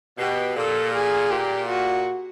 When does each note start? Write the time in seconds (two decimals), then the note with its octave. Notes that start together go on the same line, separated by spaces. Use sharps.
0.18 B2 G4
0.56 A#2 A4
0.94 G#4
1.30 A#2 G4
1.68 F#4